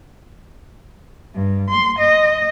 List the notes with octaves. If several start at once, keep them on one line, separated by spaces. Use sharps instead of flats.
G2
C6
D#5